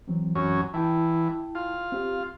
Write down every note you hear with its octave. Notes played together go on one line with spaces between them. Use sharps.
E3 F#3 C4
F#2 C#4
E3 E4 G5 A5
F4
C4 G4 F5